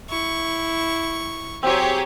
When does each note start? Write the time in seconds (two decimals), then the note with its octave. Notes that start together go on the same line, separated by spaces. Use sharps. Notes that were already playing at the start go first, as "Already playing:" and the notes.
0.10 E4 C#6
1.63 F#3 C4 G4 G#4 C#5